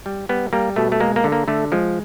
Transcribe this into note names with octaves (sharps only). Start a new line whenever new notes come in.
G3
G3 B3
G3 A#3
B2 A3
A3
G#3 A#3
A#3
D3
A#3
D3 A3
F3 G#3